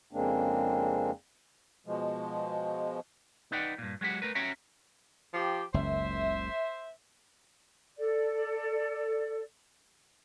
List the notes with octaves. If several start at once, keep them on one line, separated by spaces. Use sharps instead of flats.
F2 C#3 G#3 A#3 C4 D4
B2 F3 G#3
D#4 B4 D5 F#5 G5
G2 A#2
F#3 G#3 F#4 G4 F#5
A3 A#4 B4
C#4 F#4 C#5 E5 G5 A#5
F3 G4
F#1 C#2 F#2 C5 E5
A4 D5